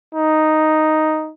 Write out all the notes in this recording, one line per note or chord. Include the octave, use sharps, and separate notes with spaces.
D#4